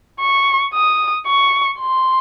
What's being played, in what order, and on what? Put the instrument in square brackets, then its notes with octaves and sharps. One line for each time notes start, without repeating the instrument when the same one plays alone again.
[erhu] C#6
D#6
C#6
C6